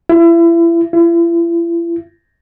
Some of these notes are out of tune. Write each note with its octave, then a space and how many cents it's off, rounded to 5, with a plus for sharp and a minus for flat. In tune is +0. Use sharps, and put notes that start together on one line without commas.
E4 +30
E4 +40